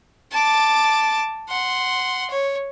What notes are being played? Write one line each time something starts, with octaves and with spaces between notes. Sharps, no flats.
A5 D6
F#5 C6
C#5